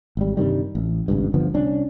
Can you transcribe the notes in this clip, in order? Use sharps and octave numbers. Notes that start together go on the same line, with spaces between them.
G#1 G3
G2 C3 D#3 G3
A1
G#1 C#2 G2
G1 D3 F3 B3
C2 C#4 D4